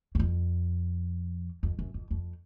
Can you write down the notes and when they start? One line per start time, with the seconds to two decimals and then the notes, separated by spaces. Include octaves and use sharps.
0.15 F#2
0.19 F2
1.63 F2
1.79 F#2
1.94 F2
2.11 F2